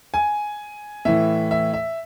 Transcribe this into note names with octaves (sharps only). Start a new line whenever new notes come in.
G#5
A2 E3 E5
E5
E5